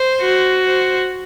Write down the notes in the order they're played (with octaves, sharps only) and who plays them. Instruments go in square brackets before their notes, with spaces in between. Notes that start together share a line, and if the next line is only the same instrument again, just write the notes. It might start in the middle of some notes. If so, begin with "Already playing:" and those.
Already playing: [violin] C5
[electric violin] F#4
[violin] C5